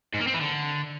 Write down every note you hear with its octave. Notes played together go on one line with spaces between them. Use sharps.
G#2
A#3
C4
E3
D3